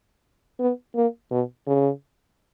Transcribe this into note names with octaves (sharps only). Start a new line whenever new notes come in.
B3
A#3
B2
C#3